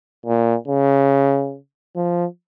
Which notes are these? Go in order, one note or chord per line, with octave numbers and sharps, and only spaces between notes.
A#2
C#3
F3